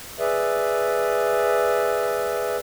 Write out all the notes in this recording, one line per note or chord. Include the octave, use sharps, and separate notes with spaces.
G#4 B4 D5 E5